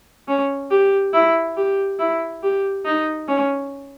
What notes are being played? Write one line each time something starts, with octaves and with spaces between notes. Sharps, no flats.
C#4
G4
E4
G4
E4
G4
D#4
C#4